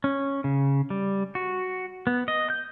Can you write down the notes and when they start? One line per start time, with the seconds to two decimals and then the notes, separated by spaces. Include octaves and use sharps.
0.04 C#4
0.44 C#3
0.90 G3
1.35 F#4
2.07 B3
2.28 D#5
2.50 G6